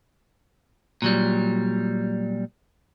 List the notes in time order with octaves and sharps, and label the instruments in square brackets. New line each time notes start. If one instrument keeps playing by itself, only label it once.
[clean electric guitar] A#2 F#3 G3